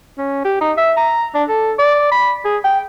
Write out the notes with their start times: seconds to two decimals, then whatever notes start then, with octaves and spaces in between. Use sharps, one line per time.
0.18 C#4
0.45 G4
0.61 D#4
0.77 E5
0.97 A#5
1.34 D4
1.49 A4
1.79 D5
2.11 B5
2.45 G#4
2.64 G5